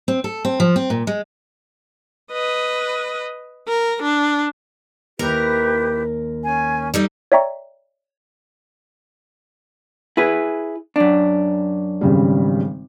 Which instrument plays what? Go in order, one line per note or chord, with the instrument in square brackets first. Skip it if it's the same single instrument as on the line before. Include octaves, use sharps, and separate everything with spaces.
[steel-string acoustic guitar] C4
A4
C4
F3
C4
A#2
G#3
[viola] B4 D#5
A#4
D4
[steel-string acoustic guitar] D#2 A#4 A#5 [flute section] E4 G4 B4
[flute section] C#4 G#5
[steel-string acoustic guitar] G3 D#4 A4
[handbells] C#5 D5 E5 G5 A#5 C#6
[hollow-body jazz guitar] E4 G#4 B4
F#2 D4
[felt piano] G#1 C#3 G3